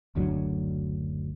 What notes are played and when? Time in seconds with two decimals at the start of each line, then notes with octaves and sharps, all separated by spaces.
0.15 F#1 D2 F#3 D4